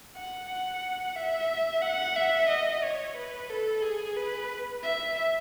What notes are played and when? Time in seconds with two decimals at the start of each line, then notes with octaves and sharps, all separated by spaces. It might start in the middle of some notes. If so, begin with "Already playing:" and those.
0.16 F#5
0.49 F#5
1.16 E5
1.82 F#5
2.16 E5
2.49 D#5
2.83 C#5
3.16 B4
3.50 A4
3.82 G#4
4.16 B4
4.83 E5